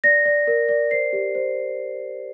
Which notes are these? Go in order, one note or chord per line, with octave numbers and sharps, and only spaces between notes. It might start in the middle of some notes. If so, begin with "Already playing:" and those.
D5 A#6
D5
A#4
D5
C5 C7
G4
C5